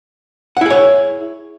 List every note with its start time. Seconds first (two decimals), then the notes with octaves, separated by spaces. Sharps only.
0.57 F#5
0.61 E4
0.66 G#4
0.70 C#5